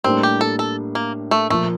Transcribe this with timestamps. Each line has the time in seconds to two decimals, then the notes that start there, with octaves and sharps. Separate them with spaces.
0.04 A2 G3 A#3 C4 D4
0.23 G4
0.41 A4
0.59 A4
0.95 A#3
1.31 A3
1.50 A#2 F3 A3 A#3